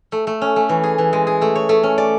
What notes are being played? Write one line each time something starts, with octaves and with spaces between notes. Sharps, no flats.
A3
A3
C#4
A3
E3
G#4
E3
G#3
G#4
A3
C#5
A3
C#4
D5